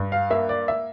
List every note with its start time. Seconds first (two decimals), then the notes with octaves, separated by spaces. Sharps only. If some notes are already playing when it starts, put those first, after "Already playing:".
Already playing: G2
0.12 F5
0.30 A#3 E5
0.49 D5
0.68 E5